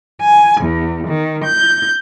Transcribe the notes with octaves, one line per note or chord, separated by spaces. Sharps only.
G#5
E2
D#3
G6